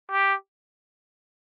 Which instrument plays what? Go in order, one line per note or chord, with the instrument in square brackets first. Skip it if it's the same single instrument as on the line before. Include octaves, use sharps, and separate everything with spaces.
[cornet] G4